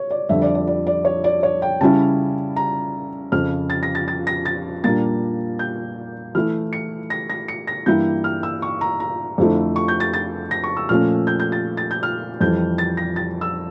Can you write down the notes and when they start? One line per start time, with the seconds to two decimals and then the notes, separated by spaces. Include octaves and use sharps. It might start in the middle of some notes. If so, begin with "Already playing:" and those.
Already playing: C#5
0.11 D5
0.29 F2 D3 G3 E5
0.42 D5
0.55 D5
0.67 D5
0.87 D5
1.05 C#5
1.24 D5
1.43 C#5
1.62 G5
1.81 C#3 G3 C#4 E4 A5
2.56 A#5
3.32 F2 C#3 F3 F6
3.70 A6
3.83 A#6
3.95 A6
4.08 A6
4.27 A#6
4.46 A6
4.84 A#2 G3 A#3 D4 A6
5.59 G6
6.35 E3 A3 E4 F6
6.73 C#7
7.10 A#6
7.30 A#6
7.48 C#7
7.67 A#6
7.86 G2 E3 G3 A#3 E4 G6
8.24 F6
8.43 E6
8.62 C#6
8.81 A#5
9.00 A#5
9.38 F2 D3 F3 A3 E4
9.76 C#6
9.88 G6
10.00 A6
10.14 A6
10.51 A#6
10.64 C#6
10.77 E6
10.89 A#2 F3 A3 C#4 F6
11.27 G6
11.40 G6
11.52 A6
11.77 A6
11.91 G6
12.03 F6
12.40 F2 E3 G3 G6
12.78 A6
12.97 A#6
13.16 A6
13.41 E6